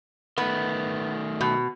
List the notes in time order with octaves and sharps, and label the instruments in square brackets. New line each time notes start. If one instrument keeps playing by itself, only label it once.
[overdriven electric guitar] D#3 A3 [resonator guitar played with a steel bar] B3
[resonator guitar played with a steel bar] B2